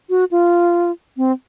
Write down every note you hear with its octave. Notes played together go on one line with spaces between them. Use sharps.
F#4
F4
C4